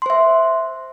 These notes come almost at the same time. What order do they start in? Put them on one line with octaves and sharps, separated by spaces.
C6 C5 E5